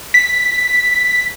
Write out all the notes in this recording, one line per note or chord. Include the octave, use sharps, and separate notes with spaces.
B6